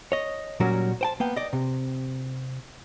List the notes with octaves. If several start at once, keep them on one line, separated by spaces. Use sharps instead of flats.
C#5 D#5
A#2 F#3 G3 C#4 F#4 A#4
C5 G5 A5
A#3 B3 G5
D5 D#5
C3